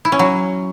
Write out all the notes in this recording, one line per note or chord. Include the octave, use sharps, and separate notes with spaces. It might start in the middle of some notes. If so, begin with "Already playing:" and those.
E4
C#4
F#3